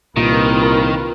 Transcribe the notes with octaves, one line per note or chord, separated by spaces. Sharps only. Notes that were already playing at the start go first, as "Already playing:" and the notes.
C2 A#2 D#3 F4 A#4 B4